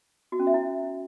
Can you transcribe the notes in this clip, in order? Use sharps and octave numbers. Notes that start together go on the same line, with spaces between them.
F#4
C#4
E5
E4